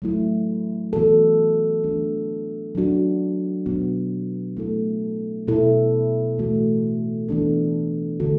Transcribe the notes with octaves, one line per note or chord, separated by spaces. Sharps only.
F#3 A3 E4
E3 B3 F#4 A4
E3 A3 D4
F#3 D4 F#4
B2 F#3 B3 D4 F#4
A3 E4 A4
B2 B3 E4 A4
E3 A3 F#4
E3 B3 D4 A4
D3 A3 F#4 A4